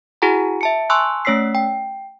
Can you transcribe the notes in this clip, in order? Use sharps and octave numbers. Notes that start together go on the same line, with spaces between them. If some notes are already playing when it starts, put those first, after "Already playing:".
E4 F#4 G#4 F#5 G#5 A#5
E5 A5 C#7
G#5 A5 C6 C#6 E6 F#6
A3 C#4 C#5 E6 B6 C7
G5